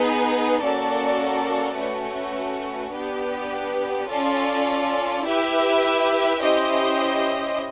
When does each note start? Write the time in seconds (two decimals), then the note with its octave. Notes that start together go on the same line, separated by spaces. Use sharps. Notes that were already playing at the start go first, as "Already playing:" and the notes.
Already playing: B3 D#4 G#4 B4
0.62 A#3 C#4 F#4 A4 D5
1.77 A3 C#4 F#4 B4
2.93 B3 D4 G4 B4
4.09 C#4 F4 A4 D5
5.25 E4 G4 B4 E5
6.41 C#4 E4 G4 C5 D#5